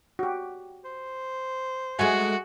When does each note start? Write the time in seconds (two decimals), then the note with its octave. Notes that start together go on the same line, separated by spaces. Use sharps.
0.19 F#4 G4
0.85 C5
1.99 G#3 A3 F#4 G#4 G#5